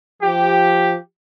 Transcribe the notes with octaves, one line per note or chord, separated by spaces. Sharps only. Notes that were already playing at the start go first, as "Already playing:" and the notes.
F3 G4